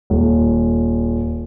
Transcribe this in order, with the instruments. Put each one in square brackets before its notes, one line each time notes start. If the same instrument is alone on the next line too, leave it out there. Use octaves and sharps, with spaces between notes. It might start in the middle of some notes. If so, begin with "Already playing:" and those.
[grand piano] D#1